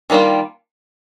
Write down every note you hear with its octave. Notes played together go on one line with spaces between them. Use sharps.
D#3 G3 A#3 D4 F4